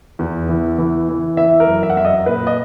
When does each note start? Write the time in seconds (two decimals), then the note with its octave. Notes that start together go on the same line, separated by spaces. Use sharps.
0.19 E2
0.49 E3
0.78 E3
1.09 E3
1.37 E3 E5
1.60 A#4
1.67 F#2
1.83 E5
1.90 F#5
1.97 F#2 E5
2.05 D#5
2.26 A#2 B4
2.47 D#5